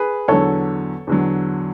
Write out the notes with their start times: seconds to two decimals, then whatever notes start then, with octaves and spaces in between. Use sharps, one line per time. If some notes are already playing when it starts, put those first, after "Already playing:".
Already playing: G#4 B4
0.28 E2 D3 F#3 A4 C#5
1.07 E2 D3 F#3